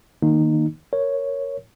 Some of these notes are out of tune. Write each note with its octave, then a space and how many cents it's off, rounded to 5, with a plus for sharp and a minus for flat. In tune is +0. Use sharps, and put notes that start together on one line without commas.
D#3 +0 A#3 +0 D#4 -15
A#4 +0 C#5 +0